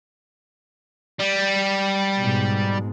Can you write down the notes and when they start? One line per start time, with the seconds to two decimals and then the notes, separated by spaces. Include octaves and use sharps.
1.19 G3
2.19 G#2 B2